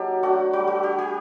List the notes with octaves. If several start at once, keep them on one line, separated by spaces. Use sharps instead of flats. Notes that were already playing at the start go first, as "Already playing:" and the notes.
Already playing: F#3 A#3 D#4 G4 A4
A3 D4 F#4
G3 F#4
F#4
D4 G4
G4